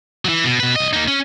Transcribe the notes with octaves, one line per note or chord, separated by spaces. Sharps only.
E3 F#3
B2
B2 B4
C2 D#5
A#3 D#4
C#4